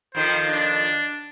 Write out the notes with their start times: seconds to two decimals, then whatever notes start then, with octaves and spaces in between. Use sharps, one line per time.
0.15 F2 D#3 F3 C5
0.49 D4